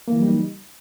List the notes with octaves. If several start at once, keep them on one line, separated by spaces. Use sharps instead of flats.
E3 F#3 G3 A#3 D#4